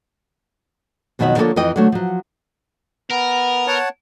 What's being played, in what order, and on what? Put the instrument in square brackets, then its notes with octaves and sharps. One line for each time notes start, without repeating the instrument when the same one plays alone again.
[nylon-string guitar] F2 B2 D#3 F#3 E5 F#5
D3 F3 A#3 G4 A4 C#5
F2 E3 D#5 G5
D3 F#3 A3
F3 F#3
[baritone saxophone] B3 [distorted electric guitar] A#4
[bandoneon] C#5 F#5 A5